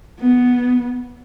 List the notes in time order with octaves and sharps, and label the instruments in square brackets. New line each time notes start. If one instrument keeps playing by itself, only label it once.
[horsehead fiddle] B3